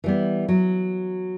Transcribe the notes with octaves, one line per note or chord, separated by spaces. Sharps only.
E3 G3 B3
F#3